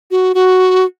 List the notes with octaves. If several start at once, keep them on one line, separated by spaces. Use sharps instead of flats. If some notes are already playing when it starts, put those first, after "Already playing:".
F#4
F#4